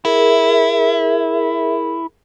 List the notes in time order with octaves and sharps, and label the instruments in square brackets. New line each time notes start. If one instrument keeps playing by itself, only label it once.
[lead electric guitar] E4 [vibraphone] G#4 A#4 E5